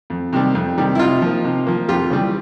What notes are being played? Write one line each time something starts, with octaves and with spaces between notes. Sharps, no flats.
F2
C3 D#3 G3
F2
C3 D#3 G3
E4
C3 D#4 F4
F3 A#3
C3
F3 A#3
F2 F4 G4
C#3 E3 G3